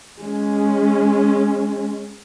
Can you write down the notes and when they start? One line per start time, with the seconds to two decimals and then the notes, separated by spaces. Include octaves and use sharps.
0.21 G#3 C#4